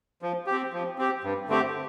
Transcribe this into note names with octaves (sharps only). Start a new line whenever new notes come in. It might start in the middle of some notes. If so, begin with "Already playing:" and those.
F3
G4
C4
F3
C4 G4
G2
D3 A3 C4 G4